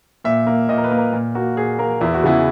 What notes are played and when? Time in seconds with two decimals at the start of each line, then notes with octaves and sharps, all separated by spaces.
0.24 A#2 E5
0.47 A#3
0.69 A#2 D#5
0.78 A#4
0.84 B4
0.92 A#3
0.98 A#4
1.13 A#2
1.35 A#3 F#4
1.57 A#2 G#4
1.79 A#3 A#4
2.01 E2 E4
2.14 F#4
2.24 C#3 E3 B3 E4